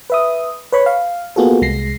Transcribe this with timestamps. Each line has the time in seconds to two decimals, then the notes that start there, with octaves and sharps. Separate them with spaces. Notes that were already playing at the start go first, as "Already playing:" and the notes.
0.10 B4 E5 D#6
0.72 B4 C#5 B5 C#6
0.86 F5
1.36 A#3 B3 F4 F#4 G#4 A4
1.61 C2 G#3 A#6 C7